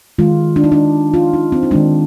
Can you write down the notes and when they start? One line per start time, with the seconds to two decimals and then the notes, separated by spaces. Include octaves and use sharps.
0.19 D#3 G#3 F4
0.56 D4
0.64 D#4
0.72 D4
1.14 F4
1.33 D#4
1.52 C4
1.63 D#4
1.71 D#3 G#3 D4